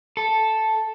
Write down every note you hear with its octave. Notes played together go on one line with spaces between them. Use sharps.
A4